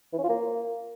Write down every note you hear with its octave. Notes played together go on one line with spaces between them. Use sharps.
E3
C#4
F4
A#3